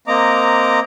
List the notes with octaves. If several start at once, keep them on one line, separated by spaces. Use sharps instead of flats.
A#3 C4 D#5 A#5 D6